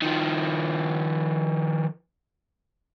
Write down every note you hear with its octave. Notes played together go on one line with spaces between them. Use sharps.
D#3 F3